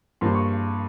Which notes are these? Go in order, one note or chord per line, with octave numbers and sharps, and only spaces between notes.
G2 F3 A#3 C6
C#6